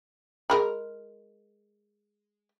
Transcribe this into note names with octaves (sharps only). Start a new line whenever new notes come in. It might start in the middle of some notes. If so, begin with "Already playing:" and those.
G#3 A#4 B5